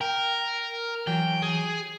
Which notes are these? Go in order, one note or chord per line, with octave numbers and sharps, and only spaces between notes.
A#4 G5
E3 F#3 G5
G#4